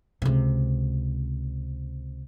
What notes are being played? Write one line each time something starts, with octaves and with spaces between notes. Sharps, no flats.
C#2 C3